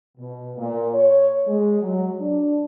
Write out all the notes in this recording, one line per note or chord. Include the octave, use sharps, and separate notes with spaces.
B2
A#2
C#5
G#3
F#3
D4